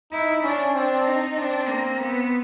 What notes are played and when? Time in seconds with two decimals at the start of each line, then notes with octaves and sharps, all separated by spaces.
0.12 D#4 E4
0.43 C#4 D4
0.74 C4 D4
1.06 D#4
1.37 C4 D4
1.68 A#3
1.99 B3